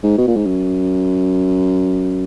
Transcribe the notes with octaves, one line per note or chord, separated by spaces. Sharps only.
G#2
B2
A#2
G#2
F#2